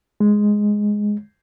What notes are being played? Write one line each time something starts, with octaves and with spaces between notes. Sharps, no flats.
G#3